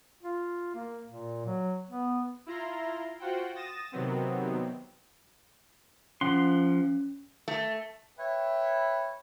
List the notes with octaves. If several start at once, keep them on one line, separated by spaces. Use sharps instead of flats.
F4
A#3
A#2
F#3
B3
E4 F4 A#5 C6
F4 F#4 C5 F#5 G5
D#6 A6 A#6 E7
C3 D#3 F#3 B3 C4
F3 C#4 F#5 C6
A3
B4 C#5 E5 G5 B5